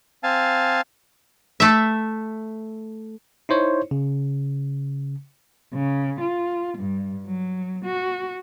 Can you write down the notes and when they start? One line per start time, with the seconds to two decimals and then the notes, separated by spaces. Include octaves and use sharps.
0.23 C4 F5 G#5 A5
1.60 A3 E5
3.49 D#4 E4 C5 C#5
3.91 C#3
5.73 C#3
6.19 F4
6.78 G2
7.26 F#3
7.83 F#4